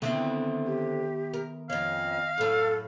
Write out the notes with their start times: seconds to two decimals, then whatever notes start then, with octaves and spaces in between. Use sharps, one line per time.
0.02 D3 D#3 B3 C4 E4 E5
0.66 G4
1.33 A#4
1.70 F2 C#4 D#5 F5
2.38 F#2 A2 A4